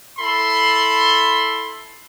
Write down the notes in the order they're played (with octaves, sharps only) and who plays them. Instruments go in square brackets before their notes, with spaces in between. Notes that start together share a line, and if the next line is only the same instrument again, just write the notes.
[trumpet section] E4 A4 B5 C6